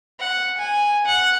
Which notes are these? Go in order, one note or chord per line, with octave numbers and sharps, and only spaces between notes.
F#5
G#5
F#5